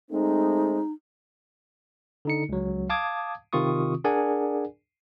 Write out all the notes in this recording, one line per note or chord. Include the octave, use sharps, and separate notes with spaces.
G#3 A3 C4 D#4
D3 D#4 C#7
C#2 F#3
F5 A5 D6 D#6 G#6
C3 D#3 C4 F4 C#6 D#6
D4 G#4 A#4 D5 F#5 G#5